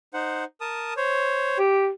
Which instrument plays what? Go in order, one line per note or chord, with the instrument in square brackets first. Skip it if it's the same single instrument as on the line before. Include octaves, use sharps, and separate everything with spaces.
[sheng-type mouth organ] D#4 C5 F#5
A#4 A5 D#6
C5 C#5
[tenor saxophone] G4